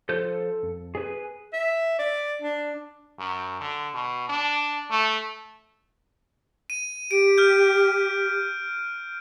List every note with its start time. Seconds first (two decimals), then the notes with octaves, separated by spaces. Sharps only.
0.09 F3 A4 C5 G6
0.23 A4
0.63 F2
0.95 G#4 B4 G#5
1.53 E5
1.99 D5
2.42 D4
3.19 F#2
3.61 D3
3.94 B2
4.29 D4
4.91 A3
6.70 D#7
7.11 G4 D7
7.38 F6 G6